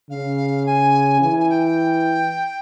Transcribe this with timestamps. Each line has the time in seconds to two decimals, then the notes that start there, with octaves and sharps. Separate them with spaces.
0.10 C#3 F5
0.66 G#5
1.21 E3 G#5
1.40 G#5
1.49 G5